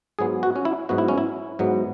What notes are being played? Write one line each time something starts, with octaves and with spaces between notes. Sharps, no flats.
G#2 F#3 B3 G#4
F#4
C#4
E4
G#2 F#3 B3 F#4
E4
C#4
E4
G#2 F#3 B3